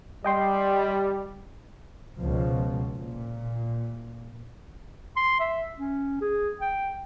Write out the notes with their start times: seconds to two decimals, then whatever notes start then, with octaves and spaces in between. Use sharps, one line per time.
0.24 G3 D#5 G5 C6
2.18 C#2 B2 F3
2.96 A#2
5.16 C6
5.40 E5
5.79 C#4
6.21 G#4
6.61 G5